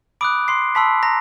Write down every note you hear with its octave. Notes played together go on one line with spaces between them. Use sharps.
B5 D6 D#6 F#6 D7
C6 C7
A5 B5 C6 E6 B6
A#5 A#6